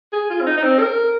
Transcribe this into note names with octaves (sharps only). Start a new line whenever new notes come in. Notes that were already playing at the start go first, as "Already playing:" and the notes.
G#4
F4
C4
D#4
D#4
C4
A#4